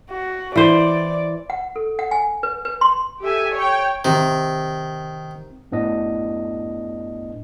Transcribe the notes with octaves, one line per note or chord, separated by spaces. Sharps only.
F#4
E3 C5 D5
F#5
A4
F#5
G#5
B4
B4
C6
G4 A4 E5 G#5
C#5 G5
C3 D#3
F#2 A2 B3 D4 D#5